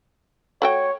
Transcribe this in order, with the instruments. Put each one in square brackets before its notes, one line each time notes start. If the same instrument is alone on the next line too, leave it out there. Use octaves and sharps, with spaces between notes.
[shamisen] A3 F#4 G5 [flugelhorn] C#5